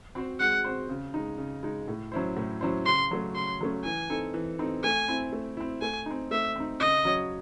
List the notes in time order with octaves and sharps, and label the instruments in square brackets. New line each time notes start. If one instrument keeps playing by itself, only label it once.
[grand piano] C4 F#4 C5
[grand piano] G#3 [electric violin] F#5
[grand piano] C4 F#4 C5
C#3
G#3 D#4
C#3
G#3 D#4
A2
F#3 C#4 E4 C5
A2
F#3 C#4 E4 C5
[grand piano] C#3 [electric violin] C6
[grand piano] F#3 A3 C#4
[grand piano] C#3 [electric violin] C6
[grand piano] F#3 A3 C#4
[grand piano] E3 [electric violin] G#5
[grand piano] C4 D#4 A4
E3
C4 D#4 A4
[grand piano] A3 [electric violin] G#5
[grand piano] C4 E4
A3
C4 E4
[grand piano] A3 [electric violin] G#5
[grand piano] C4 D#4
[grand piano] A3 [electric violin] E5
[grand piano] C4 D#4
[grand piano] C#3 [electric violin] D#5
[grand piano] F#3 C#4 F#4 C#5